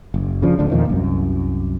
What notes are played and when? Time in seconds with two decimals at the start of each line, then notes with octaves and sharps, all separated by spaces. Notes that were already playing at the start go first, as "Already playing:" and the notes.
0.14 F#1
0.42 C#3 F3 D4
0.59 D1 D2 D3 D4
0.70 E2 A#2 D#3 F3
0.90 C2 F#2